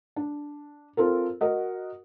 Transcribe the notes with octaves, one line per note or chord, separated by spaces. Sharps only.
D4
C4 F4 A4 A#4
F#4 A#4 D#5 F#5